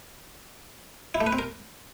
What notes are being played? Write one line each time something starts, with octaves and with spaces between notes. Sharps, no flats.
E4
A3
B4
C4
A#4